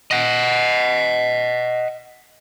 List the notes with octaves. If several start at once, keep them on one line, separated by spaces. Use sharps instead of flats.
D#5 F#5